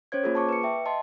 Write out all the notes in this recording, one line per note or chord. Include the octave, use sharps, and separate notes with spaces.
C#4 C5 C#5 G#6
A#3 F4 G#4 A#4
A5 C#6 D6
B4 C#7
E5 G5
D#5 A5 C6